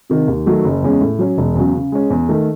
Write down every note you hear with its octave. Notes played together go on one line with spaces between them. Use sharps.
C3 D#3
D#2
D#3 F#3 A3
F#1
E2 C#3 G#3 C#4
A2
F#3 C#4
E1
E2 C#3 F#3
C#3
G#3 C#4
E2
D#3 A3